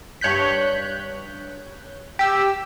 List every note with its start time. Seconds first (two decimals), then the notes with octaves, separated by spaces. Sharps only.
0.21 G2 C#5 F#6 G6 B6
2.19 G4 E6